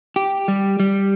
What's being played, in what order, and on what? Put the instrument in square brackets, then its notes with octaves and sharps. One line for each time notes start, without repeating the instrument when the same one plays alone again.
[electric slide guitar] G4
G3
G3